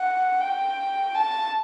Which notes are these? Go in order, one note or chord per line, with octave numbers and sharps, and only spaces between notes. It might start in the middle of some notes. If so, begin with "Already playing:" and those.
Already playing: F#5
G5
A5